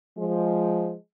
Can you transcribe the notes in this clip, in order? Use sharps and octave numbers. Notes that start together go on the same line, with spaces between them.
F3 G#3